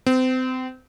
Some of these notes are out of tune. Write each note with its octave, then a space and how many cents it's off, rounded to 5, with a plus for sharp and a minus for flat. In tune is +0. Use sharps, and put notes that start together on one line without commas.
C4 -30